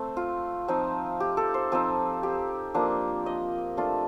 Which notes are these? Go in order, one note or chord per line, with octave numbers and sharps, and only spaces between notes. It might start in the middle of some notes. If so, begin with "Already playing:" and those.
Already playing: A3 C4
F4
F3 C4 D#4
G4
A4
C5
F3 C4 D#4
G4
F3 A#3 D4
D#5
A3 D4 F4